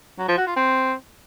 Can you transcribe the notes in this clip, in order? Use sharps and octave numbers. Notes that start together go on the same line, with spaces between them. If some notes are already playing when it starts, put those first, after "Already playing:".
F#3
F3
F#4
F4
C4